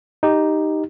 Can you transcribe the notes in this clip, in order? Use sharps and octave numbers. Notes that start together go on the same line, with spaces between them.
D#4 G4